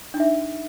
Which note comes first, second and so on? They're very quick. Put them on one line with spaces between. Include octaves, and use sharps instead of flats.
D4 D#4 E5